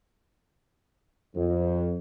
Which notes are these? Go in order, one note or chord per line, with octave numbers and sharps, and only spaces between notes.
F2